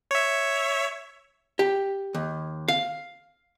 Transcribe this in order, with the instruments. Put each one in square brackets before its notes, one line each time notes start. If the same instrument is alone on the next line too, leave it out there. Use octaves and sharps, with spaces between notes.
[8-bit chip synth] C#5 E5
[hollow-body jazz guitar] G4
D#2
F5